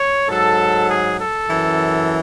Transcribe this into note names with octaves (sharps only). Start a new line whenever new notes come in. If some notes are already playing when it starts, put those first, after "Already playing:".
Already playing: C#5
G#2 F#3 A4
G#4
A4
F#2 E3